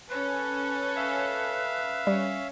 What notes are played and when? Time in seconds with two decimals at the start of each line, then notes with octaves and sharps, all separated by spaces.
0.10 C#4 A4 B4
0.96 E5 F5
2.07 G3 C#4